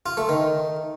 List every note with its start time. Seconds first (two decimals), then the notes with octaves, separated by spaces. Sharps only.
0.06 F4
0.17 A3
0.29 D#3